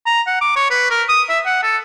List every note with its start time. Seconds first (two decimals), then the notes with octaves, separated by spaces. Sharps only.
0.06 A#5
0.27 F#5
0.41 D6
0.56 C#5
0.70 B4
0.91 A#4
1.09 D#6
1.29 E5
1.46 F#5
1.63 A4